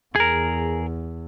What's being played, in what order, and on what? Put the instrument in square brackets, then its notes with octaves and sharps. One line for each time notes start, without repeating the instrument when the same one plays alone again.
[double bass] E2 [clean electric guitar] G#4 A#4